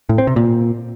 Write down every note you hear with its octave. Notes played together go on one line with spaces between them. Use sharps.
A2
C4
C3
A#2